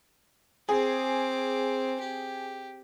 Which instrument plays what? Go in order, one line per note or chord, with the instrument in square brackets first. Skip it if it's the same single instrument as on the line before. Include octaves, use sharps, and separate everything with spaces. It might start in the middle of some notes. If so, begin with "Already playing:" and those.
[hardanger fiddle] C4 D6 [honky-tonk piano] G#4
[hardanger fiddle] G4